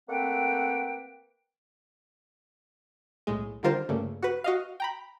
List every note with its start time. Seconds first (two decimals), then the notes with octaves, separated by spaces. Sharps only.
0.09 A3 A#3 C4 B4 F#5 G5
3.27 B1 A2 G#3
3.63 D3 D#3 G3 F4 A#4 C5
3.89 G2 C#3 G3 A3 A#3
4.23 F#4 B4
4.44 F#4 D#5 F5
4.80 G5 A#5 B5